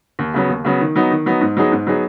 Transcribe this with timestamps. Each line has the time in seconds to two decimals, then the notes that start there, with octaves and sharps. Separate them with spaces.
0.19 D#2
0.34 C#3 F#3 B3
0.49 D#2
0.65 C#3 F#3 B3
0.80 D#3
0.96 F#3 B3 D#4
1.11 D#3
1.26 F#3 B3 D#4
1.41 G#2
1.57 F#3 B3 D#4 G#4
1.72 G#2
1.87 F#3 B3 D#4 G#4